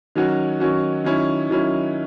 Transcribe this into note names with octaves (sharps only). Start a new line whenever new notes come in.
D#3 F#3 C#4 F#4
D#3 F#3 C#4 F#4
D#3 F#3 C#4 E4
D#3 F#3 C#4 E4